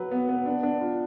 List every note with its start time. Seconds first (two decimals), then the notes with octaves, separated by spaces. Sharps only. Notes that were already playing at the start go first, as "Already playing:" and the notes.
Already playing: F#3 B4
0.11 B3
0.29 B3
0.46 D4
0.63 D4
0.81 F4